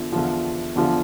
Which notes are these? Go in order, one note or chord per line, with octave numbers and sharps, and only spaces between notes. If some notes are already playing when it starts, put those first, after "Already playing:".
Already playing: E2 D3 F3
E2 D3 F3
E2 D3 F3